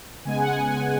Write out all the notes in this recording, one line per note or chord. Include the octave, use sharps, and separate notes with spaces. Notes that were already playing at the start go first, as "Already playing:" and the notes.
C#3 G#3 B3 G#5
F#5
G#5
G#5